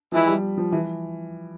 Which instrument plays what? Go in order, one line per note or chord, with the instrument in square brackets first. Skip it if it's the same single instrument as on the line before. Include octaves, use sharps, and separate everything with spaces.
[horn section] E3 G#3 E4 [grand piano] F3
[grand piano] G3
F3
E3